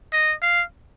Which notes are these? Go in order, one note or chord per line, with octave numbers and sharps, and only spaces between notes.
D#5
F5